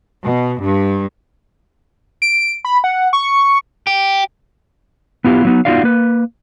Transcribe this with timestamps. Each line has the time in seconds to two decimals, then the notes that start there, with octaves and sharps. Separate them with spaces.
0.22 B2
0.60 G2
2.22 D7
2.65 B5
2.84 F#5
3.13 C#6
3.87 G4
5.24 B3 E4 F4 G4
5.45 F#3 B3 D#4
5.65 B3 D#4 F4 F#4 D5 F5
5.84 A#3 B4